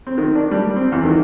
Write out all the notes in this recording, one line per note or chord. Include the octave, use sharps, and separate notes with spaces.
C4
D#3
D4
G3
C4
E2
D#3